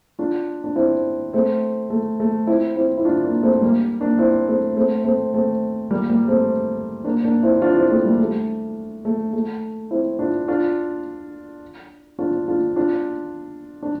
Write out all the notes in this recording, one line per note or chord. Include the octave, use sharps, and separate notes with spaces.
D4 F4
D4
C4 E4
A3 C4
A3
A3
C4 E4
C4 E4
E4
D4 F4
A#3 D4
A3 C4
G3 A#3
A#3 D4
C4 E4
A3 C4
A3 C4
A3 C4
A3 C4
G3 A#3
G3 A#3
A3 C4
A#3 D4
A#3 D4
C4 E4
D4 F4
C4 E4
A3 C4
G3 A#3
A3
A3
A3
C4 E4
D4 F4
D4 F4
D4 F4
D4 F4
D4 F4
D4